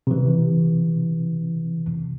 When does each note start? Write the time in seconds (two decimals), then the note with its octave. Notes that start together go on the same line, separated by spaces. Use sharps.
0.07 C3 E3